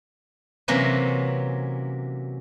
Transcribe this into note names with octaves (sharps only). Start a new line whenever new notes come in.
C3 E3 F#3 A#3 C#4